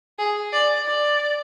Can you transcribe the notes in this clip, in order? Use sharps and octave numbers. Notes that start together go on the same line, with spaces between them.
G#4
D5
D5